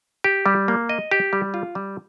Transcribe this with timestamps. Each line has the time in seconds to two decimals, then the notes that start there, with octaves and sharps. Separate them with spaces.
0.24 G4
0.46 G3
0.68 A#3
0.89 D#5
1.11 G4
1.33 G3
1.54 F4
1.75 G3